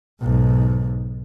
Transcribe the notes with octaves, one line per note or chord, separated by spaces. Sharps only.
B1 G#2